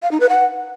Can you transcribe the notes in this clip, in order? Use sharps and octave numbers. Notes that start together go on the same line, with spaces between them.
F5
D#4
B4
F#5